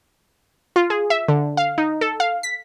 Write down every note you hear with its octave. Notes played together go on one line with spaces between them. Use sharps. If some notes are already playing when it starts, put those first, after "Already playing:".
F4
G#4
E5
D3
F5
D#4
A4
F5
B6